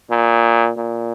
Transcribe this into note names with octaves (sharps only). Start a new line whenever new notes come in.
A#2
A#2